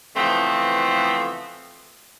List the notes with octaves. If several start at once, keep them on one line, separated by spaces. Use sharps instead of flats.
C#3 E3 F3 A3 B3 C4